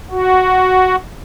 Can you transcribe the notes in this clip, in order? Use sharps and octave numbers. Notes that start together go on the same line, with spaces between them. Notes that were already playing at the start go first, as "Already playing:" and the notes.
F#4